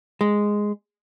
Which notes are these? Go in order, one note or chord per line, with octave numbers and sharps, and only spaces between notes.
G#3